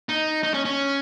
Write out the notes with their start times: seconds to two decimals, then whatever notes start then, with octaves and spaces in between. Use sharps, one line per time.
0.09 D#4
0.43 D#4
0.54 C#4
0.65 C#4